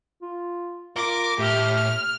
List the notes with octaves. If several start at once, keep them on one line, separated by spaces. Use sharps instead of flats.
F4
F4 A#4 D6
A2 A3 G4 F6
F6